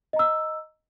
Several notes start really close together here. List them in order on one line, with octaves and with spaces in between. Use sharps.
D#5 A#5 E6